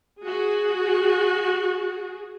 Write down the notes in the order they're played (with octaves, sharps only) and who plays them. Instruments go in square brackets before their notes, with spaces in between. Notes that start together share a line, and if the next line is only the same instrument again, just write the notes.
[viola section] F#4 G#4